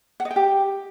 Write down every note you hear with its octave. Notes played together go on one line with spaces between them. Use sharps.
F#5
D#5
G5
G4